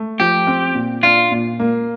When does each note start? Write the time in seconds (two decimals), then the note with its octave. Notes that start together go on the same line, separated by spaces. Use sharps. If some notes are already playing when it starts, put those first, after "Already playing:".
Already playing: A3
0.20 F3 G4
0.47 C4
0.75 A#2
1.03 D4 F4
1.32 A#2
1.60 A#3